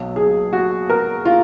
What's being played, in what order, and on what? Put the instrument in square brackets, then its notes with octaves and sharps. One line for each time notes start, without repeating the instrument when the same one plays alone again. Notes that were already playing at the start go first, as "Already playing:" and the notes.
Already playing: [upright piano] B1 B2 F#3
G#4
F#4
A#4
F4